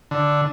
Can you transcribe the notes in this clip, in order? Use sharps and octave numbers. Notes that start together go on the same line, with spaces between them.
D3